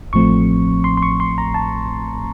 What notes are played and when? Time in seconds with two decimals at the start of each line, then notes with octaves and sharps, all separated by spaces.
0.13 A1 A2 F3 A3 C4 C#6
0.84 C6
0.97 C6
1.02 C#6
1.20 C6
1.38 A#5
1.54 A5